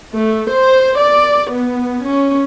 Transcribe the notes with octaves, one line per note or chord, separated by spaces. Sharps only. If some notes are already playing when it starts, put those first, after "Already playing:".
A3
C5
D5
B3
C#4